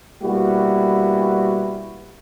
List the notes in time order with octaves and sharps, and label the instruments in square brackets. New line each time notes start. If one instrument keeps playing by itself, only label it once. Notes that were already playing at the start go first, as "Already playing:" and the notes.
[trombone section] B2 G3 A#3 E4 F#4 B4